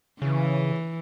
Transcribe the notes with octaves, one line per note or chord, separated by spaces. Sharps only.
C#3 E3